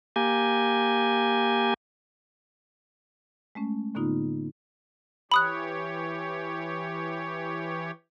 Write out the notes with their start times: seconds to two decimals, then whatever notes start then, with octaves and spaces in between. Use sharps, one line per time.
0.16 A#3 G4 G#5
3.55 G#3 A3 C#4
3.95 A2 D3 A#3 B3 D#4 F4
5.32 E3 G4 C#5 B5 D#6 F#6